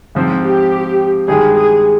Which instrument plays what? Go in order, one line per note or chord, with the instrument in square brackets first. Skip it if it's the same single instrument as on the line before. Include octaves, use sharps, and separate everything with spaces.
[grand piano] G#2 F3 C4
[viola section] G4
[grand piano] G2 D#3 G#3 [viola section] G#4
[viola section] G#4